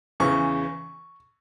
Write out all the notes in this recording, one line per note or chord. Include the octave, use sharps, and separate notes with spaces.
E2 C#3 E3 C#6